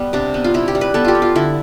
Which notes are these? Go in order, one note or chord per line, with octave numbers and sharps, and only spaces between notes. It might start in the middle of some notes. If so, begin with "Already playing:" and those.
Already playing: G3 B3
C3 D4
B3
F4
C3 E4
G4
G3
B4
B3 A4
F4 G4
B3
F4
D3 E4